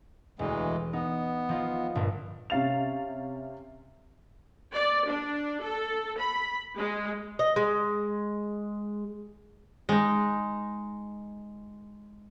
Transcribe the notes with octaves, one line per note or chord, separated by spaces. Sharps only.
E1 D2 E3 G#3
B3 D#4
F3 D#4 F4
G1 A#2 A3
C3 C#4 F5 A6 F7
D5
D4
A4
B5
G#3
D#5
G#3
G#3 D#4